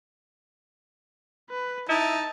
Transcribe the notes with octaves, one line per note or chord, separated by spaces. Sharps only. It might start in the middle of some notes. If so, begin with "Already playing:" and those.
B4
D#4 E4 A5